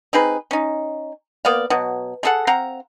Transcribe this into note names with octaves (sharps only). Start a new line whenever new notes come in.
C4 D#4 G#4 B4
C#4 D#4
A#3 B3 D5 F5
B2 F#3
A3 G#4 A4 F#5
C4 F5 F#5 A#5